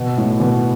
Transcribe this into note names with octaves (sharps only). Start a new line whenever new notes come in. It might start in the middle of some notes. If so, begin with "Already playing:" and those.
Already playing: B2
A2
B2